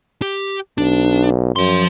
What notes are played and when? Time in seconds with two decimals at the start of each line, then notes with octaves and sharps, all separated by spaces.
0.22 G4
0.78 B1 D4
1.56 F#2 F3 C6